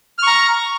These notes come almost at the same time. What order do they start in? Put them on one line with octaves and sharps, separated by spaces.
F6 C#6 A#5